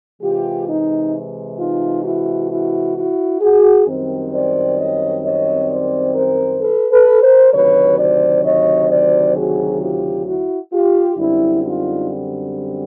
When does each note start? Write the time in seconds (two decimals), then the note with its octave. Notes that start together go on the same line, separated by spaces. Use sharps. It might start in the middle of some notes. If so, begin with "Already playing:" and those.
0.21 C3 E3 G#3 F4 G4
0.67 D#4
1.58 D#4 F4
2.04 E4 F#4
2.49 E4 F#4
2.96 E4 F#4
3.41 F#4 G#4
3.86 F#2 D#3 G3 C4
4.32 C5 D5
4.78 C#5 D#5
5.24 C#5 D#5
5.69 C5 D5
6.15 A#4 C5
6.61 A4 B4
6.91 A4 B4
7.22 A#4 C5
7.52 D2 C3 D#3 F#3 B4 C#5
7.97 C5 D5
8.43 C#5 D#5
8.89 C5 D5
9.34 F#4 G#4
9.80 F4 G4
10.26 E4 F#4
10.72 F4 G4
11.17 F#2 D3 G3 C4 E4
11.63 D#4 F4